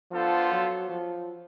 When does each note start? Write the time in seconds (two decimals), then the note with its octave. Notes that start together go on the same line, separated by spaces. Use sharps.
0.11 F3 B3 D4 F4 A4 C5
0.51 F#3
0.89 F3